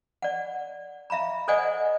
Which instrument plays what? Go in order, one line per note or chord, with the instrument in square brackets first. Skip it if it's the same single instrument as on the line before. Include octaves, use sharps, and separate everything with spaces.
[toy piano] D5 F#5
E5 F5 A#5 B5
A4 C5 D5 D#5 F#5 G#5